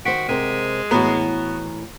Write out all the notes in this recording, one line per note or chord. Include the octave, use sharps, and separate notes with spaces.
D#3 F#4 C5 F#5 B6 D7
C3 G#3 A#4 C5
A2 E3 B3 F#4 A#5